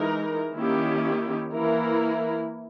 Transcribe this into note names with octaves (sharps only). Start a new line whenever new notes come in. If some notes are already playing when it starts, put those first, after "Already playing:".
Already playing: E3 G#3 D#4 A#4
D#3 A#3 C#4 E4 G4
E3 A#3 E4 A#4